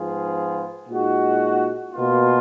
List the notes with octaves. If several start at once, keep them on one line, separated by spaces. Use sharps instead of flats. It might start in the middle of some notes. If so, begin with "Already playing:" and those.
Already playing: G#2 F3 B3 F4 G#4
A#2 G#3 D#4 F#4
B2 A#3 F4